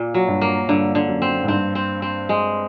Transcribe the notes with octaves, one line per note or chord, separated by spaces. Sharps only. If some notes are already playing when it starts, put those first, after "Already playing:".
Already playing: A#2 A#3
F#3
G2
A#3
G2 D3
D3
F#2
C4
G#2
G2 C4
C4
C4
G#3